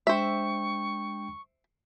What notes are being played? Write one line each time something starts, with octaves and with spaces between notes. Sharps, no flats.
G#3 D4 C5 E5 G5 C#6